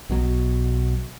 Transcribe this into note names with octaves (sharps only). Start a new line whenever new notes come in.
B1 B2 F#3